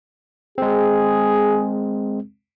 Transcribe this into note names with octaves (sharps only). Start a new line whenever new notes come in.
G#3 C4 G#4